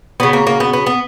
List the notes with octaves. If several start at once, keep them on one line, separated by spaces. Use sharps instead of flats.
C#3 F#3 B3
A#3
A#3
B3
B3
B3